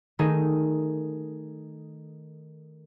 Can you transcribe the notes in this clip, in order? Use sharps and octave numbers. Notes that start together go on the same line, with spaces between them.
D#3 A3 D#4 G#4 A4